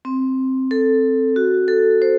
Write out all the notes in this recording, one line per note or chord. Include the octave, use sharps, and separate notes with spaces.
C4
A4
F#4
A4
C5